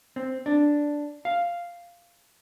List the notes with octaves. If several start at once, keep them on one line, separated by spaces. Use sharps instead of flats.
C4
D4
F5